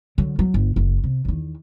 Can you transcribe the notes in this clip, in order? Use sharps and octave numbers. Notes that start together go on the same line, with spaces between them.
D3 F#3
F#3
G1
F#1
C3
E2 D#3